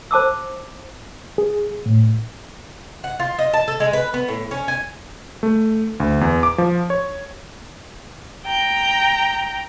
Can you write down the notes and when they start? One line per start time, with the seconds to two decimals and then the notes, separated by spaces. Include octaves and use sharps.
0.11 C5 A5 D6 E6
1.38 G#4
1.86 A2
3.04 F#5
3.20 F4
3.39 D#5
3.53 A5
3.68 A4
3.80 G#3
3.93 B4
4.14 B3
4.28 A2
4.51 C#4
4.68 G#5
5.43 A3
6.00 D2
6.21 E2
6.43 D6
6.58 F3
6.90 C#5
8.46 G5 A#5